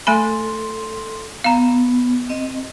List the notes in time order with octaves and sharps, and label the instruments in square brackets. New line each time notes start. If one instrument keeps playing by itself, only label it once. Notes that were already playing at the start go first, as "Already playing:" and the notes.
[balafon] A3 G#5 B5 [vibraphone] A4 C6
[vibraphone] B3 [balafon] F5 A#5
[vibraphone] C4 D#5